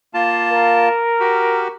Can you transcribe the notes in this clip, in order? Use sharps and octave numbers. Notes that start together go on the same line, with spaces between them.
A#3 F4 A5
A#4
F#4 G4